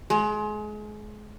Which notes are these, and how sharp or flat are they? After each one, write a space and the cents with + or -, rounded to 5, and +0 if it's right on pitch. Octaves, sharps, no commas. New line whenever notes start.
G#3 +30